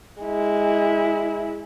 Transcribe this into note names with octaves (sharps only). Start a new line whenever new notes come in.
G#3 E4